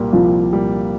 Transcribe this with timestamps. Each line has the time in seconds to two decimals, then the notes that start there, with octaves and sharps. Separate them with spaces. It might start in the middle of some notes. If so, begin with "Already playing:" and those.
Already playing: C2 A#2 G3 A#3
0.12 C2 F3
0.51 A#2 G3 A#3